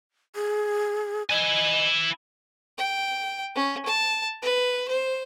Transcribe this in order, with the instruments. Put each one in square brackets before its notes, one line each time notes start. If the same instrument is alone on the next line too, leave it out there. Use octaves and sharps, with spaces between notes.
[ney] G#4
[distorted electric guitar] E4 G#5 [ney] D#5
[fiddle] G5
C#4
A5
B4
C5